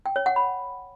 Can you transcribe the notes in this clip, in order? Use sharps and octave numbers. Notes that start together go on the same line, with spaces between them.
G5
C#5
F#5
B5